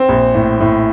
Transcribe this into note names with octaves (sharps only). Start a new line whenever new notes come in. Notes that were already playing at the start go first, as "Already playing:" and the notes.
Already playing: C4
A#1
A2
A2